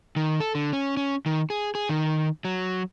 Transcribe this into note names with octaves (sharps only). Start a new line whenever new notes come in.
D#3
A4
D3
C#4
C#4
D#3
G#4
G#4
D#3
F#3